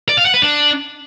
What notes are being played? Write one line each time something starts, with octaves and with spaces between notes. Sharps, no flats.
D5
F5
F#5
B4
D4